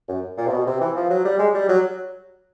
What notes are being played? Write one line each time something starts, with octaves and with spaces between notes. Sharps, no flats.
F#2
A#2
C3
B2
C3
E3
F3
F#3
G3
G#3
G3
F#3